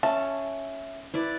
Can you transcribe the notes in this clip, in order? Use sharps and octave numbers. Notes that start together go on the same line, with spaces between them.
C#4 E5 A5
E4 B4 D5